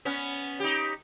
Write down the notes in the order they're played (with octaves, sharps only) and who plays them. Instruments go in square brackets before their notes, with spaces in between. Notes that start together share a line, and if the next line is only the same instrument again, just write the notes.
[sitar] B3 C#4
D#4 G4